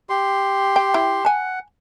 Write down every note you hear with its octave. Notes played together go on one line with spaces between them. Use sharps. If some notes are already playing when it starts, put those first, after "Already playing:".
G4 C6
G5
E4 G5
F#5 G#5 A5